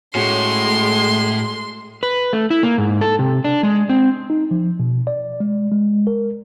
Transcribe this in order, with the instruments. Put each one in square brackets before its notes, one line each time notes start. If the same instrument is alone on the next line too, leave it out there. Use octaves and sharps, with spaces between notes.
[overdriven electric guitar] A2 [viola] G#3 A3 [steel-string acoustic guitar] C#4 F#4 [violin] C6
[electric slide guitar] B4
A3
E4
A#3
G#2
A4
C3
D4
G#3
C4
[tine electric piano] D#4
F3
B2
D5
G#3
G#3
A#4